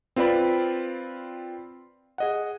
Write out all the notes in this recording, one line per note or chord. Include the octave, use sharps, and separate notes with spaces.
C4 F4 B4 D5 B5
G#4 D#5 F#5